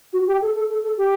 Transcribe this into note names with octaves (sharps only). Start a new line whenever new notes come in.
F#4
G4
A4
A4
A4
A4
G4